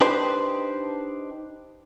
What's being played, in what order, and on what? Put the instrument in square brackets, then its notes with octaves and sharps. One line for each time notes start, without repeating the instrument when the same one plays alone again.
[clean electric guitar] D4 D#4 G4 B4 C5